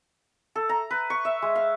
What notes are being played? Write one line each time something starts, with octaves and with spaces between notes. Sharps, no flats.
A4
A#5
B4
C#6
E5
G#3
F5